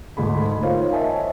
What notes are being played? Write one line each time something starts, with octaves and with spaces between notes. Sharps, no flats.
D2 G#2 G#4 B5
D#4 F4 A#4 C5 C#5 F5
C#5 D#5 E5 G#5 A5